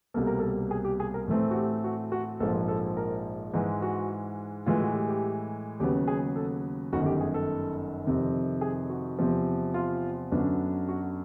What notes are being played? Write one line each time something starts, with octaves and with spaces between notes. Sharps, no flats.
C2 B2 G3 A#3 A4
A#4
A4
G#4
G4
G#4
A#4
A2 E3 A3 C4
F#4
G4
F#4
F#4
A#1 G#2 F3 A#3 A4
A4
A#4
G#2 E3 G#3
F#4
A2 E3 G#3 F4
F#4
G4
G4
D#2 C#3 F#3 B3 G4
G#4
A4
G1 F#2 D#3 F#4
G4
G#4
A4
F2 C3 D#3
G#4
F#4
E2 C3 F3
F4
F#2 D3 F#3 B3 D4
F#4